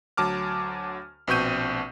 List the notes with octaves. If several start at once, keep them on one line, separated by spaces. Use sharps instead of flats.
D2 F#3 A5 D6 F6
A#1 B2 C4 C#6 G6 D#7